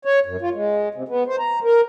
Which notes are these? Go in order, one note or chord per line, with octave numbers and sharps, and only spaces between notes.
C#5
F#2
F4
G#3
C3
B3
C5
A#5
A#4